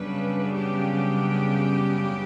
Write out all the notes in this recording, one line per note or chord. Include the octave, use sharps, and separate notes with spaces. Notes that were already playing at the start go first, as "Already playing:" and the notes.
Already playing: F#2 C#3 G3 B3 D4 B4
G4